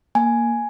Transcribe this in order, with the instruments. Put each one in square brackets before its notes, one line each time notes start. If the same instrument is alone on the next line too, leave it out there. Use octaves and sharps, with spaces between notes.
[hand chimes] A#3 G#5